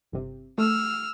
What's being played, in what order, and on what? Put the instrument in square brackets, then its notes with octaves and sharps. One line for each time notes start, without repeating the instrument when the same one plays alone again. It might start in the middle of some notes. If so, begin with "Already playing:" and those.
[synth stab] G1 C3
[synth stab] A3 [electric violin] E6 F6